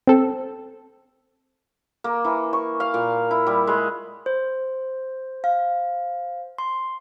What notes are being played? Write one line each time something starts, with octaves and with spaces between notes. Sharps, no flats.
C4 A4
A#3
E3
C#6
F5
A#2
E4
G3
G#3
C5
F5
C6